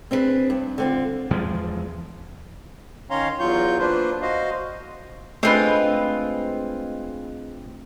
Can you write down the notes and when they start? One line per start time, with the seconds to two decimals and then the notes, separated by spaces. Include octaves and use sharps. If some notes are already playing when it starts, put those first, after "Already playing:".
0.11 C4 D4 E4 G#4 B4
0.50 G2
0.78 D3 C4 F4
1.31 E2 F3 G#3
3.10 D#3 C#4 C#5 F5 A#5 C6
3.40 E2 F#3 F4 C#6 G6
3.79 A#3 D4 F4 B4 C5
4.22 F#4 C5 D#5 F5
5.43 G#3 A3 C4 D4 F4 B4